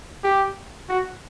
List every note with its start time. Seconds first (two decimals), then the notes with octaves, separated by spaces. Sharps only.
0.24 G4
0.89 F#4